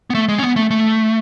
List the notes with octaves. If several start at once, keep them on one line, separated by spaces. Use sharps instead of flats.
B3
A3
G#3
C#4
B3
A3
A3